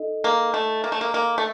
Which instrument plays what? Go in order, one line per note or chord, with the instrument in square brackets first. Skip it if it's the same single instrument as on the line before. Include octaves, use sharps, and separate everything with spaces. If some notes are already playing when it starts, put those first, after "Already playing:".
Already playing: [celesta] D#4 A4 D#5
[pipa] A#3
A3
A#3
A3
A#3
A#3
A3